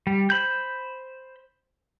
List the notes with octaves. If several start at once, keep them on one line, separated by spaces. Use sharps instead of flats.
G3
C5 B5 G6